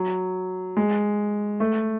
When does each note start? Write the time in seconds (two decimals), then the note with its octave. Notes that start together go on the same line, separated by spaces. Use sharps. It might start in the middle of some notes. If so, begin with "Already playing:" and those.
Already playing: F#3
0.77 G#3
1.60 A3